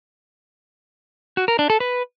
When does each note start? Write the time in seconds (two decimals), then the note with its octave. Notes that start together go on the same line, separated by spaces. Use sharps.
1.37 F#4
1.48 A#4
1.59 D4
1.70 A4
1.80 B4